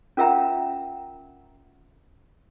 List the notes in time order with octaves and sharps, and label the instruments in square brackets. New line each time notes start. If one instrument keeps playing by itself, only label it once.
[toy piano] C#4 F4 A#4 E5 F#5 A#5